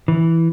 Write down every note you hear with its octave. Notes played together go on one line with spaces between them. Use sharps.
E3